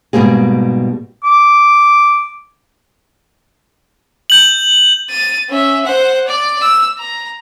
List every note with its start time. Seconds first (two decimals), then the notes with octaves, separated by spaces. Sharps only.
0.13 G#2 B2 G3 A#3 G#4
1.24 D6
4.30 G6 F#7
5.10 A6 D#7
5.50 C#4 E5
5.85 C5 F#5
6.28 D5
6.62 E6
6.99 A#5